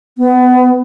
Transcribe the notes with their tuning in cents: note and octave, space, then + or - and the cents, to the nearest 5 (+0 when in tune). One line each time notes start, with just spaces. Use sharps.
B3 +30